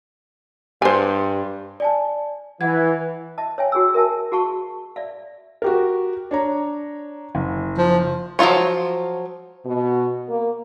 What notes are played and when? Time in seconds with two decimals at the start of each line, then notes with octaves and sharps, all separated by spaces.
0.82 G2 C5 G#5
1.80 D5 G#5 A5
2.61 E3 F#5 G#6
3.38 D#5 E5 A5
3.58 C#5 E5 G5 G#5
3.72 F#4 G#4 C#5 E6
3.94 A#4 E5 G#5 A5
4.32 F#4 G#4 F5 A5 C#6
4.96 D5 E5 F5
5.62 F#4 G4 A#4
6.31 D4 C#5 A#5
7.35 F#1
7.78 F3
8.39 F3 F#3 D#4 F4 C#5
9.66 B2
10.28 A#3